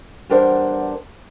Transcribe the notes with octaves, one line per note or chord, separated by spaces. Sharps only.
E2 G3 D4 A#4 C5 F#5